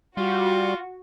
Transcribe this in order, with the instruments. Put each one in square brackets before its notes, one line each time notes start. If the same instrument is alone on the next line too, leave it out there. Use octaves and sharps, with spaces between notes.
[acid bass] G3 [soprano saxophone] F4 [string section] F#4